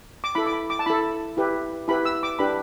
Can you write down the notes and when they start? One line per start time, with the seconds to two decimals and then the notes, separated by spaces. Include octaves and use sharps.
0.24 D6
0.35 E4 A4 B5
0.47 D6
0.53 B5
0.70 D6
0.79 A5
0.86 E4 A4 B5
1.37 E4 G4 B4
1.88 E4 G4 B4 B5
2.05 E6
2.23 D6
2.39 D4 G4 B4 B5